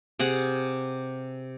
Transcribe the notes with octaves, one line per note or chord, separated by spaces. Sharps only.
C3 G#4 F#5